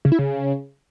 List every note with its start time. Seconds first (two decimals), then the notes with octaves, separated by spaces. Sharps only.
0.05 C#3
0.12 E4
0.19 C#3